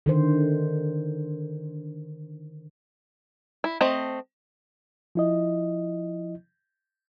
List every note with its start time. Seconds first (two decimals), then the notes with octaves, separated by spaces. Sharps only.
0.06 D3 D#3 C5
3.64 E4
3.81 A3 C4 D#5
5.15 F3 E4 D#5